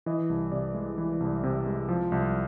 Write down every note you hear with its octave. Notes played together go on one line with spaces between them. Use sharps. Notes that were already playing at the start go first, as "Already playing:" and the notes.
E3 D#5
C2
C3 D5
G#3
E3
C2
C3
G#3
F3
C2